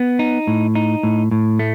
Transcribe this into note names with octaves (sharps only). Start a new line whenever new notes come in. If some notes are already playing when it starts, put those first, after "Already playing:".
Already playing: B3
D#4
A2
D#4
A2
A2
A3